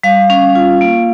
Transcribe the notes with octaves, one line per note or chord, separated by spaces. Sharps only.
G3 F5
C#4
F4
A#3